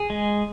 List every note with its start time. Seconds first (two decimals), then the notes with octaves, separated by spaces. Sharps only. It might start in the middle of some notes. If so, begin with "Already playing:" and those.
Already playing: G#4
0.10 G#3